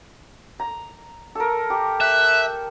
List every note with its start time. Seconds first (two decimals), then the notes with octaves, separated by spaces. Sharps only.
0.60 A#5
1.35 A4 A#4
1.70 G4
2.01 E5 F#6